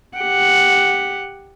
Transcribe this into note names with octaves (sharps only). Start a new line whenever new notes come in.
G4 F#5